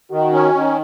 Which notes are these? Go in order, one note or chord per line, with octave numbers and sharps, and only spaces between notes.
D#3 F#4
C#4
D#3